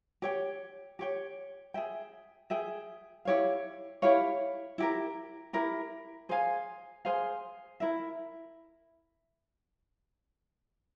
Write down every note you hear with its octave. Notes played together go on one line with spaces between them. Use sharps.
G4 C#5 G5
G4 C#5 G5
G#4 E5 G5
G#4 E5 G5
E4 G4 C#5 F5
E4 G4 C#5 F5
E4 G4 A#4
E4 G4 A#4
G#4 C5 F5 G#5
G#4 C5 F5 G#5
E4 A#4 E5